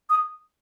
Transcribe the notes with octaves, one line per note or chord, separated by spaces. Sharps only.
D#6